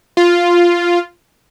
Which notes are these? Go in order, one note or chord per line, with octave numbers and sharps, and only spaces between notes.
F4